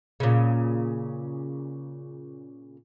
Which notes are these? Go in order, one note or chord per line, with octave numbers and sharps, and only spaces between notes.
A#2 C#3